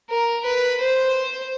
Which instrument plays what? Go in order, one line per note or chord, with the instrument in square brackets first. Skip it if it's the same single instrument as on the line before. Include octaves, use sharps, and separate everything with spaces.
[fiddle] A#4
B4
C5